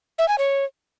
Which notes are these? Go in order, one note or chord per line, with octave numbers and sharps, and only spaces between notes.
E5
G#5
C#5